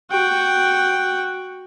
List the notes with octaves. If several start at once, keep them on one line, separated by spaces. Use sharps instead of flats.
F#4 G5